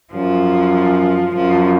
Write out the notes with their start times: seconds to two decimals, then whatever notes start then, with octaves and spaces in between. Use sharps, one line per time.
0.13 F#2 F3
1.35 F#2 F3